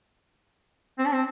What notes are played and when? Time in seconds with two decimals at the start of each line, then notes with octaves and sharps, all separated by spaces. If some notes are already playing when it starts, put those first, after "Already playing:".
0.99 C4
1.06 D4
1.13 C4